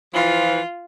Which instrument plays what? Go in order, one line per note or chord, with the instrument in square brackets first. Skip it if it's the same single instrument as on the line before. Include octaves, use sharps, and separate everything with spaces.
[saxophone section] E3 F3 [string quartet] F4